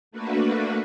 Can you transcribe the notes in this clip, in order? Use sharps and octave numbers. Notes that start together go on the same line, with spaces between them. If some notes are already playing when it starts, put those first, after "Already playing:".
A3 A#3 D4 F#4 B4